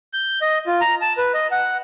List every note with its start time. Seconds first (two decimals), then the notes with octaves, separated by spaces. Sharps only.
0.13 G6
0.42 D#5
0.67 F4
0.81 A#5
1.01 A5
1.18 B4
1.34 D#5
1.51 F#5